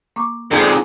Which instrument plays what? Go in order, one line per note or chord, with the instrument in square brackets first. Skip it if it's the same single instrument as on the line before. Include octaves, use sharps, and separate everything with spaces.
[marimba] A#3 C#6 D6
[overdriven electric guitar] F2 G#2 [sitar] D3 G#3 B3